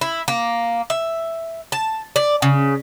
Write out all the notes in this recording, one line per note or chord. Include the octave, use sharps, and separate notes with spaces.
E4
A#3
E5
A5
D5
C#3